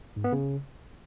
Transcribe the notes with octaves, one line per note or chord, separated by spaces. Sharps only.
G#2
B3
C#3